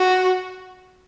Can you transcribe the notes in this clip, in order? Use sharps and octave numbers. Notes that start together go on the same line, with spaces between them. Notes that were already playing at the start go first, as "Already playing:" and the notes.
Already playing: F#4